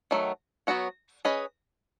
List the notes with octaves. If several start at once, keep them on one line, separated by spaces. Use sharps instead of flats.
D#3 F#3 A3
F#3 B3 F#4 C#5
C#4 G#4 B4 D#5